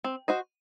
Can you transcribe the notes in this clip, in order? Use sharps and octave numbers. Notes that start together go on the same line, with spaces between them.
C4
F#4 C5 D#5